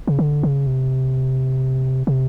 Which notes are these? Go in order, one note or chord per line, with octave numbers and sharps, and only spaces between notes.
C#3
D3
C#3
C3
C3